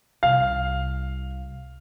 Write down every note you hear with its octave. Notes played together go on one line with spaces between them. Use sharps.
C2 F5